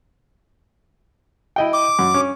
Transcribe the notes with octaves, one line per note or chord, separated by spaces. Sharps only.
E4 D#5 G5
D6
F#2
C#4